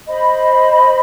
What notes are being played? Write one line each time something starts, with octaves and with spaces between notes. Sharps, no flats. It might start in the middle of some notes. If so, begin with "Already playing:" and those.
C5 D#5 B5